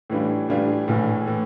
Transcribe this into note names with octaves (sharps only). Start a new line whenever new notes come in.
A2 E3 G3 D4 F4
A2 E3 G3 D4 F4
A#1 A2 E3
A2 E3